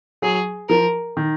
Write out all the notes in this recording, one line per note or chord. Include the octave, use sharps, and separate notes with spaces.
F#3 G#4
F3 A#4
D#3